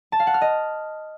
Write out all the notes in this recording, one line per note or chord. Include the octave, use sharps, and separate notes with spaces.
A5
F5
F#5
F6
D#5